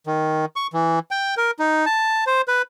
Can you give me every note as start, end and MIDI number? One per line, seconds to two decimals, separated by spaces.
0.07 0.45 51
0.56 0.67 85
0.73 0.99 52
1.11 1.35 79
1.37 1.51 70
1.59 1.85 63
1.86 2.24 81
2.27 2.42 72
2.48 2.62 71